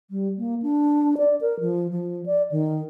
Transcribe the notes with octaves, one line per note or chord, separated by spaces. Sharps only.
G3
A#3
D4
D5
A#4
F3
F3
D5
D#3